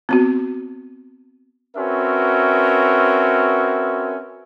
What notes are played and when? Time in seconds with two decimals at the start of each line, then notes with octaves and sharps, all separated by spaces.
0.09 B3 C4 F#4
1.76 C4 C#4 F#4 A#4 B4 E5